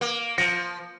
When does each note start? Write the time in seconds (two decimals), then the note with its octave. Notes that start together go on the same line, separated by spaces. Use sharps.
0.01 A#3
0.38 F3 A#6 C#7